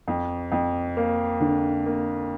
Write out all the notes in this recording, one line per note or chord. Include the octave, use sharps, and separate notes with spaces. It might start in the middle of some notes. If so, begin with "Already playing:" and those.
F2
F2
A#3
D3
A#3